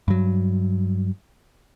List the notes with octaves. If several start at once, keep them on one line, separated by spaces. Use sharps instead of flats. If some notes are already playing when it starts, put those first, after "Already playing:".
G2 F#3